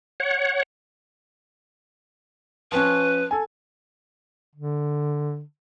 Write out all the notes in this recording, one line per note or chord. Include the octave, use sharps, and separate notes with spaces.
C#5 F#5
F3 C#4 B4
A4 G#5
D3